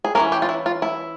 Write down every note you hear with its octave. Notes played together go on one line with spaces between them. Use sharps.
G#4
E3 A#3 C#4 A#4
G4
F4
E4
F4
E4